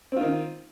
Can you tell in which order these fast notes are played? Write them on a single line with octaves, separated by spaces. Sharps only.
C4 F4 D#3